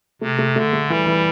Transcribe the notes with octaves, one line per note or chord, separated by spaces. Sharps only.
C3 A3
A3
D3 A3
A3
E3 G3
E3